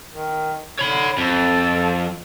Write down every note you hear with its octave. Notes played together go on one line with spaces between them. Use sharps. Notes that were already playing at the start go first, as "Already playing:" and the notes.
D#3
D3 C#5 B5
F2 A4